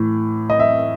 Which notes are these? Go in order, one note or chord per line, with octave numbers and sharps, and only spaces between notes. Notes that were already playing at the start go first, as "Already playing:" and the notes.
Already playing: A2 E3
D#5
E5